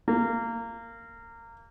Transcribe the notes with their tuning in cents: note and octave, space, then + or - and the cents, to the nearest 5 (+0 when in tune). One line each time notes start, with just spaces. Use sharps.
A#3 -20